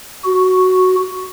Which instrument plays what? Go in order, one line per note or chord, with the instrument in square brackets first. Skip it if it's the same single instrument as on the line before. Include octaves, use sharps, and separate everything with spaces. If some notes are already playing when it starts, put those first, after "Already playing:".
[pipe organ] F#4